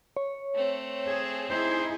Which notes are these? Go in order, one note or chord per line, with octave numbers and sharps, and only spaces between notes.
C#5
A3 C4
G#4
D#4 E4 G#4 C5